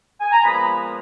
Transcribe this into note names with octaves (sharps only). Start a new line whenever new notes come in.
G#5
A#5
A#2 F3 G#3 B3 B4 B5